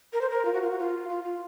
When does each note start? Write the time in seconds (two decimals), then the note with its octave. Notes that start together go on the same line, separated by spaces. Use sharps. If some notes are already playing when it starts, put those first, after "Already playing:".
0.13 A#4
0.21 C5
0.30 A#4
0.45 F4
0.53 F#4
0.62 F4
0.70 F#4
0.79 F4
1.09 F4
1.24 F4